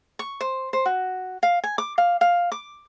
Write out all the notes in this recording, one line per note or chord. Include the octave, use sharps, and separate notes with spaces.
C#6
C5
C5
F#4
F5
G#5
D6
F5
F5
D6